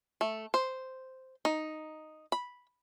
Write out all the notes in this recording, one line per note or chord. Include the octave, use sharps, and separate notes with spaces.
A3
C5
D#4
B5